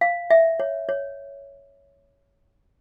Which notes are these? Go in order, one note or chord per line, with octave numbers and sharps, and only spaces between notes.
F5
E5
C#5
C#5